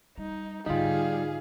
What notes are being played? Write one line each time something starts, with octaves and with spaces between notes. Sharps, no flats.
G3 D#4
G#2 D3 G3 D#4 F4 G#4 F5